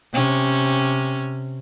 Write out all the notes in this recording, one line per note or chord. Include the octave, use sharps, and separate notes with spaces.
C3 C#4